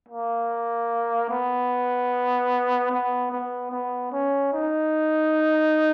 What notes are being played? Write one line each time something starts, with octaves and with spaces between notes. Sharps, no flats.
A#3
B3
B3
B3
B3
C#4
D#4